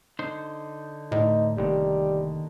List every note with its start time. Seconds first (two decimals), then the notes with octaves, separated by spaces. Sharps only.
0.19 D3 D#4 C5
1.12 D2 A2 D3 D#4
1.57 F1 A#2 D3 D#3 G3